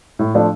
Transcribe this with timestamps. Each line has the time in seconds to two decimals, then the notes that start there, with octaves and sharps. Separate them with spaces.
0.19 A2
0.34 F3 A3 D4 F4